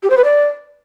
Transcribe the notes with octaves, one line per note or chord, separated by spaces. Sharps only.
G4
C5
B4
D5